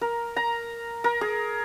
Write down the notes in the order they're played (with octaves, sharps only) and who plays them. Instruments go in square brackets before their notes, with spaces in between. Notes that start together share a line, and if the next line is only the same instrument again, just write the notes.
[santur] A#4
A#5
A#4
G#4